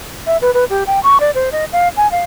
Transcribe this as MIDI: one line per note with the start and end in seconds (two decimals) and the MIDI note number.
0.27 0.37 76
0.42 0.53 71
0.54 0.65 71
0.70 0.83 67
0.87 1.02 79
1.03 1.18 85
1.20 1.31 74
1.35 1.49 72
1.52 1.65 75
1.73 1.88 77
1.97 2.10 80
2.11 2.23 77